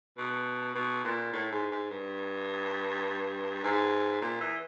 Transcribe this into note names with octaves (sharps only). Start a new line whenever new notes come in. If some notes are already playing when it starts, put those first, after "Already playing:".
B2
B2
A#2
A2
G#2
G#2
G2
G#2
A#2
E3